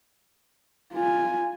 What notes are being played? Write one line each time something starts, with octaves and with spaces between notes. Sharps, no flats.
F4 G#5